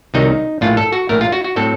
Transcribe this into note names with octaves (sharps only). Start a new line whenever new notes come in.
C2 C3 D#3 F#3 C4 D#4
A#1 A2 A3 F4
A4
F#4
A#1 A2 A3 A#4
F4
F#4
F#4
A2 F#3 C4 A4